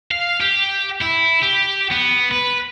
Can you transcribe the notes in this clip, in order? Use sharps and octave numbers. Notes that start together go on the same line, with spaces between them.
F5
G4
E4
G4
B3
B4